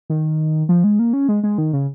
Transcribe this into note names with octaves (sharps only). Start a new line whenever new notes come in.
D#3
F3
G#3
A#3
C#4
G#3
G#3
D#3
C#3